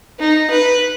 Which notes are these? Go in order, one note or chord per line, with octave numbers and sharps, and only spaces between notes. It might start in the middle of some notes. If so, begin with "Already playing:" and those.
D#4
B4